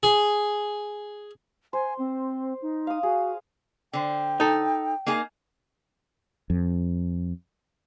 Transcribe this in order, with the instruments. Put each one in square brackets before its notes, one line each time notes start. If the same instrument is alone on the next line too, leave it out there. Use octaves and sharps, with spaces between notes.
[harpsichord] G#4
[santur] C5 [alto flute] G#5
[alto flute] C4
D#4
[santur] F5 D#6
[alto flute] F#4 [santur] G#4
[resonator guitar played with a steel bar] D3 C5 [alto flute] G5
[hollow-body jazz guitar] D#4 A4
[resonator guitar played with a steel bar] A#3 D#4 G#4
[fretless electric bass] F2